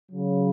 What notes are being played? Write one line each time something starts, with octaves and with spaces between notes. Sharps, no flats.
C#3 F#3